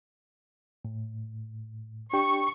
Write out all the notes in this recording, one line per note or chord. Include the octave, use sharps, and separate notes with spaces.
A2
D4 G4 G5 C#6